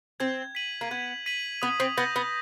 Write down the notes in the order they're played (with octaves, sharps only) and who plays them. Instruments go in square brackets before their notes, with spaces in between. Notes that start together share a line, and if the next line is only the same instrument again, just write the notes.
[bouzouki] C4 [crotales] G#6
[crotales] B6 D#7 F#7
[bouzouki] A#3
[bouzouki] B3 [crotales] G#6
[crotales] B6 D#7 F#7
[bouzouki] B3 [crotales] D#6
[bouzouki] C4
[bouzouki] B3 [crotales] G6 A#6
[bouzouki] B3